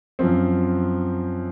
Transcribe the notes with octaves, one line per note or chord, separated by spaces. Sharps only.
F#2 F3 C4